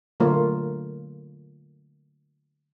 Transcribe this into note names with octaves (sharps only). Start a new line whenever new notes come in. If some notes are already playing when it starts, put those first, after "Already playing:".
D3 F#3 A3 A#3 F4 C#5